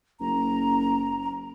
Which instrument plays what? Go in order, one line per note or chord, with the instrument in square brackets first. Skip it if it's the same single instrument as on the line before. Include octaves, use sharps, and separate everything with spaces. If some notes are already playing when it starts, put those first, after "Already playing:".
[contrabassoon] F#1 [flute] A#5